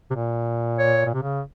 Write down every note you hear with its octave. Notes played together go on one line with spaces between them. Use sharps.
C3
A#2
C#5
A#2
C3
C#3